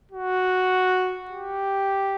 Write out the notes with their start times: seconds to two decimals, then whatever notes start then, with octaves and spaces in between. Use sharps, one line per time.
0.11 F#4
1.30 G4